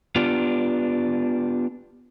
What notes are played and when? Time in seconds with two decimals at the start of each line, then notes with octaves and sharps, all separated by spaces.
0.16 B3 D4 F4 G4